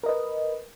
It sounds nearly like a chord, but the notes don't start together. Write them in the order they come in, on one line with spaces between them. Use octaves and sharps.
A#4 D#5 B4